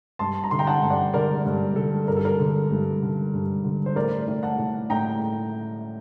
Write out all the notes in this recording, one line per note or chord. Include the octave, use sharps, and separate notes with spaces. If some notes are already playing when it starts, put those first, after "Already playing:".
G2 A5 C6
A#5
D3 C6
G5 A#5
F#5 A5
G2
D5 F#5
D3 A#4 D5
G2
D3 A4
G2 A#4
A4
A#4
D3
G2
D3
G2
D3
C5
A2 A#4 D5
A2
F#5 A5
A2
A2 G5 A#5